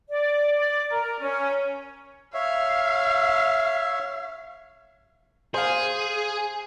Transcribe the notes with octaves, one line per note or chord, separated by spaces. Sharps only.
D5
D5
A#4
C#4
C#5 E5 F5
G#4 C5 F5